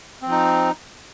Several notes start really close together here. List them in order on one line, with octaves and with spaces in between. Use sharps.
C4 F3 D#4